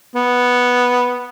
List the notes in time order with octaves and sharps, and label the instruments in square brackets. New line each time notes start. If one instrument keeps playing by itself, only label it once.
[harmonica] B3